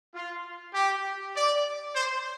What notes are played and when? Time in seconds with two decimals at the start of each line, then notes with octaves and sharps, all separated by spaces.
0.15 F4
0.74 G4
1.35 D5
1.94 C5